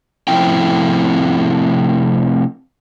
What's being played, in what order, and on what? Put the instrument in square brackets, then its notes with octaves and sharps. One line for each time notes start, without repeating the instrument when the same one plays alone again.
[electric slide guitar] C3 F3 A3 C4 E4 G5